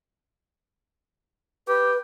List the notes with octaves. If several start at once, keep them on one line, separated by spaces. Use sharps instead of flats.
G4 B4